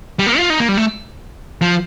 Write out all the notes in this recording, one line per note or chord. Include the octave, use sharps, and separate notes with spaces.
G3
A#3
F4
D#4
A#3
G3
A3
F3